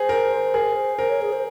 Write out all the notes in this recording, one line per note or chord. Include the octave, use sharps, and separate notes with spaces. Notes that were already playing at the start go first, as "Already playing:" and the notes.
Already playing: G#4 C5
A#4
G#4 A#4
C5
A#4 C5
C#5
G#4
C5